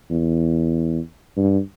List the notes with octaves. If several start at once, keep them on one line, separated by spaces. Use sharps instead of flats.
E2
G2